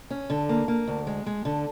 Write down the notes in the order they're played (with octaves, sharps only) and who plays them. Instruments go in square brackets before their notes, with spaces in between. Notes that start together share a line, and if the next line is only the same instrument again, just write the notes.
[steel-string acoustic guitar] C#4
D3
A#3
A#3
D2
G#3
G#3
D3